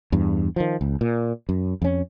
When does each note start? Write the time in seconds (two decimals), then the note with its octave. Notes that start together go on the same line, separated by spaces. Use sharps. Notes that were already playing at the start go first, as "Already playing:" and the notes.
0.12 E2 G2
0.56 D#3 F3
0.81 C#2
1.01 A#2
1.49 F#2
1.82 F2 C#4